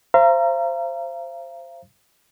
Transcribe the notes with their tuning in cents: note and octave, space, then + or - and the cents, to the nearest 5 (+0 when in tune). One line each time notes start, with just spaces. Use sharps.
C5 +10 F5 -40 A#5 +0